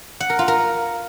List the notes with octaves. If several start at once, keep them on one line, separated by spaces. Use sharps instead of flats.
F#5
A#4
F4
A#4